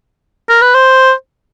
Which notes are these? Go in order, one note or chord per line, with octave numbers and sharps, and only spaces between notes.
A#4
B4
C5